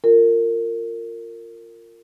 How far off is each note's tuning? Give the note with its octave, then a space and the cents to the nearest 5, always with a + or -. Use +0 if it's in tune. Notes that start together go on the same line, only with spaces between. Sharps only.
F4 +0 A#4 -25